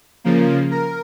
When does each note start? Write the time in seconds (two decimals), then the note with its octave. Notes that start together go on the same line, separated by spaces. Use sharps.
0.24 C#3 F3 A#3
0.71 A#4